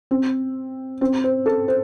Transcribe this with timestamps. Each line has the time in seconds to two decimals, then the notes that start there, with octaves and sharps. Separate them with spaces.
0.11 C4
1.01 C4
1.24 C5
1.46 A4
1.68 C5